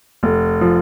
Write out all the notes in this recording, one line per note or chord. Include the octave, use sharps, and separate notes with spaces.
F1
F3